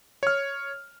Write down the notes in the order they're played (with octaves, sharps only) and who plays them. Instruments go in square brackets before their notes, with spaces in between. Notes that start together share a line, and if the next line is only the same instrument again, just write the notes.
[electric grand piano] C#5 F6